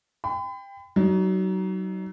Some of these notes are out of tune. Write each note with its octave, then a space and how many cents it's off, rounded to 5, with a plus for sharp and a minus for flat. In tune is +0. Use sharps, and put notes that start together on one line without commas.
G5 +20 B5 +40
F#3 +30 D#4 +0